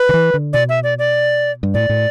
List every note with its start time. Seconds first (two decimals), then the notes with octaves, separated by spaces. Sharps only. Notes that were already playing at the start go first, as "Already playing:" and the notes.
Already playing: B4
0.09 D3
0.14 E3
0.34 D3
0.53 B2 D5
0.69 E5
0.84 D5
0.99 D5
1.63 G2
1.74 A2 D5
1.89 A2